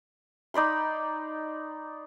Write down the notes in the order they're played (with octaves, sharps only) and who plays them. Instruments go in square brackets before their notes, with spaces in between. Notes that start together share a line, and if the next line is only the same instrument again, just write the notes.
[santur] D#4 D5 B5 C6